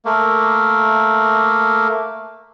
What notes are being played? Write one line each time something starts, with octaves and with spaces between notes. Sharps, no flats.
A3 A#3